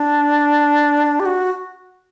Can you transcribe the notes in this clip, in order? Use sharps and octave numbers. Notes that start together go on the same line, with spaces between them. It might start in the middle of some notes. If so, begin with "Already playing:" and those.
Already playing: D4
G4
F#4